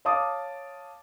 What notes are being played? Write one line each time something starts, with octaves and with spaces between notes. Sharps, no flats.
C#5 F5 A5 D6 D#6